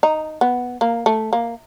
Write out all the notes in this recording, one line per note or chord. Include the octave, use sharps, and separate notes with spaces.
D#4
B3
A#3
A3
A#3